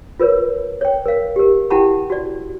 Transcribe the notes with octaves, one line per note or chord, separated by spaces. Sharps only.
F4 A#4 B4 C#5
C#5 G5
A#4 F5
G4 A#4
E4 G4 F#5 G5 A5 B5
F#4 D5